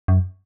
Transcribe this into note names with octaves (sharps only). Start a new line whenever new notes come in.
F#2